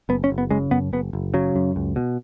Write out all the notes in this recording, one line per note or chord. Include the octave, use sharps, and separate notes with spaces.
F#1 B3
C#4
F#1
B3
C#3 G#3
F#2 B3
F#1 B3
F#1
C#3 F#3
F#2
C#2
B2